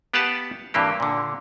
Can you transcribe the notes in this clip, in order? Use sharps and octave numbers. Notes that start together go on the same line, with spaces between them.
B3 G4 B4 F5 F#5 A5
G2 C3 E3 A#3 G4
A#2 D3